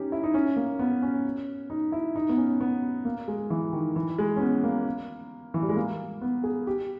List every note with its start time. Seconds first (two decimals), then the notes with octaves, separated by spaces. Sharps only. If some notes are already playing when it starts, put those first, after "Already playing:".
Already playing: C#4 D#4 G4
0.12 E4
0.23 D#4
0.34 C#4
0.56 A#3
0.79 B3
1.02 C#4
1.70 D#4
1.92 E4
2.16 D#4
2.29 B3
2.37 C#4
2.61 B3
3.05 A#3
3.28 G#3
3.50 E3
3.73 D#3
3.96 E3
4.19 G#3
4.36 C#4
4.40 B3
4.64 A#3
5.54 E3
5.63 G3
5.69 G#3
5.76 A#3
6.22 B3
6.44 G#4
6.67 G4